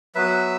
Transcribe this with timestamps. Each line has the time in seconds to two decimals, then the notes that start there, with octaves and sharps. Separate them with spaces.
0.15 F#3 B3 F#4 B4 E5